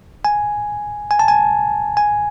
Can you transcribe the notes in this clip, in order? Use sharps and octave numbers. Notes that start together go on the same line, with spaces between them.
G#5
G#5
A5
G#5
G#5